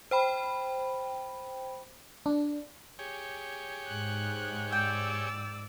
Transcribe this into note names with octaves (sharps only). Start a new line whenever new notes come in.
C5 G5 B5
D4
G4 G#4 C#5
G#2 F#6
D5 G5 E6